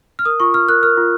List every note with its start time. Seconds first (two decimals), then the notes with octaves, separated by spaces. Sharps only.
0.19 F6
0.25 A#4 D#6
0.40 F4 C#6
0.54 F4 F6
0.69 A#4 F#6
0.83 A#4 F6
0.97 F4